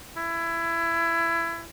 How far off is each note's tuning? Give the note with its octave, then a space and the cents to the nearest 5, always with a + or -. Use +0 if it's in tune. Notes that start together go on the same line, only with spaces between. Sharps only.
E4 +20